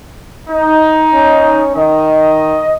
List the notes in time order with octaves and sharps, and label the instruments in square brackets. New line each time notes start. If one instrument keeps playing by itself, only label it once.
[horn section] D#4
[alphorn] C#4
[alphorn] D#3 [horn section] D#5